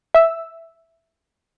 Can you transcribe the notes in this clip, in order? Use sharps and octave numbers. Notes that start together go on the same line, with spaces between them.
E5 E6